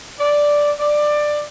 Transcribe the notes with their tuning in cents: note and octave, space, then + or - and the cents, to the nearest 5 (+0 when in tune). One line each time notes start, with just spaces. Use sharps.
D5 +0
D5 +15